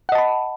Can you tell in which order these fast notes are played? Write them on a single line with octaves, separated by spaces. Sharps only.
F#5 D#5 A5 B5